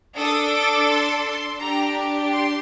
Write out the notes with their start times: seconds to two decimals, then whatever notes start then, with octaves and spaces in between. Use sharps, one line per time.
0.17 D4 A4 D#6
0.53 D6
0.89 C6
1.24 C6
1.59 D4 G4 A#5
2.30 C6